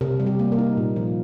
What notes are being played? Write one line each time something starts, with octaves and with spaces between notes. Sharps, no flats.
C3 A#4
G3
G4
A#3
A#4
D#4
A#2
F3